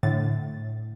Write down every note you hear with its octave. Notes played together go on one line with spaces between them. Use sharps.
A2 D3 A6